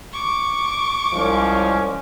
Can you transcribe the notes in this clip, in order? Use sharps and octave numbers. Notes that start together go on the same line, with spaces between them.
C#6 D6
C2 F3 G#3 C#4